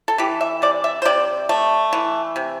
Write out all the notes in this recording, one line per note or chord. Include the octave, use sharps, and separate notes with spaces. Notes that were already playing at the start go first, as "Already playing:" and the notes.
A4
E3 G4
E5
C3 D5
E5
C5
C3 D5
A3
E3
C3